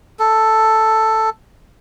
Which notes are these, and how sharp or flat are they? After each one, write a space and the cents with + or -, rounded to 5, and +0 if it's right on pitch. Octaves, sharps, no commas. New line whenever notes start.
A4 +5